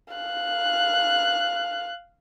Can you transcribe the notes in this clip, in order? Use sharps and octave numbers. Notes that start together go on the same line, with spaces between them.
F5 F#6